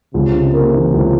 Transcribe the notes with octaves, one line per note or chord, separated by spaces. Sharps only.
C#2 C3
C#3
A#3
E3
C#2